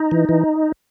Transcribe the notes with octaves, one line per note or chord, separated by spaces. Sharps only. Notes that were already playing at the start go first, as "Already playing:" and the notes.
Already playing: D#4
E3
E3